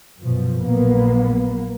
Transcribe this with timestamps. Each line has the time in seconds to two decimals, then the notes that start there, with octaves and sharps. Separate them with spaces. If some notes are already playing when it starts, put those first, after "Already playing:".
0.23 F#2 B2 F3
0.58 A#1 F#3 A#3 B3